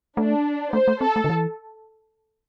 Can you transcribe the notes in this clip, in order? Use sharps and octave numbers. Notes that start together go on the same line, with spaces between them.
A3 D4
A3 C5
A3
C4 A4
A3
D3
E3